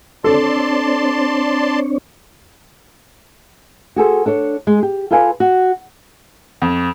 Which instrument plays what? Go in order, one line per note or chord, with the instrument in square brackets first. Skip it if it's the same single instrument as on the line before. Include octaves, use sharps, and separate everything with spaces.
[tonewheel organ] C4 D4 C#5 [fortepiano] A4 [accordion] D5 A5 C6
[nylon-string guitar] F#4 G#4 A4 C5
D4 A4 C#5
G#3 G#4
G4
F4 A4 B4 F5 G#5
F#4
[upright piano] F2